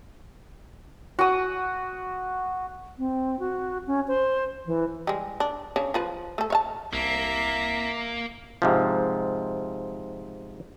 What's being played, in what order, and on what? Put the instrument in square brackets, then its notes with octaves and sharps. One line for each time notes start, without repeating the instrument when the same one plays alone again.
[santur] F#4 D#6
[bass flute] C4
F#4
C#4
C5
E3
[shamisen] G3 G#3
D4
C#3 D4 C#5
F3 F4 B4
A3 A4
C#5 F5 A5
[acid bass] C2 [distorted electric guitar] A#3 [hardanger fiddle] E5 A#5
[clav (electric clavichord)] G#2 C3 F3